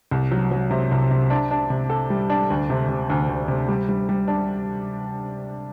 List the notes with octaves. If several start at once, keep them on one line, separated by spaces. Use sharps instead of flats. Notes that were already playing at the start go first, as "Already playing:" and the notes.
C2
F#3
F#3
C3
C2
C3
D4
D4
C3
A4
G3
D4
D2
C3
C3
D2
D2
C3
G3
G3
G3
D4